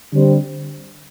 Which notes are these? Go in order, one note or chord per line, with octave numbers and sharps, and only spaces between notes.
D3 G3 C4